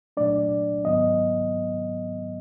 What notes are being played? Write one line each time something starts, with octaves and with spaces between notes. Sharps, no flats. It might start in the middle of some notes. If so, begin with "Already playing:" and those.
A#2 F#3 A3 D4 D5
G#2 D#3 F#3 B3 D#5